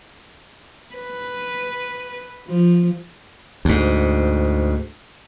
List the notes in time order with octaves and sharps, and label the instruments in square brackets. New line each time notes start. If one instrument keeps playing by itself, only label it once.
[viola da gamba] B4
F3
[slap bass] D2 G#2